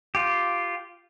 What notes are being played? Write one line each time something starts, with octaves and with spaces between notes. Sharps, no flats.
F4 G4